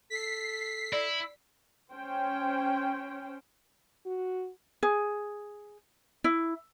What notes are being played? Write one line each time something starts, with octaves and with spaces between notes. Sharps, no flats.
A4 B6 C7
E4 D5
C#4 C5 G5
F#4
G#4
E4